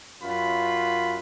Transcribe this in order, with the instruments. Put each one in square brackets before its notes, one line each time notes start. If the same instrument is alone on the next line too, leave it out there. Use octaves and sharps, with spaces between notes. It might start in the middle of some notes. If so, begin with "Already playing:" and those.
[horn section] F#2 F4 B4 B5